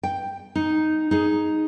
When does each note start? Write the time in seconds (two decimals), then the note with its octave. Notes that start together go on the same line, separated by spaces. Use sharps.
0.03 G5
0.55 D#4
1.11 D#4 G#4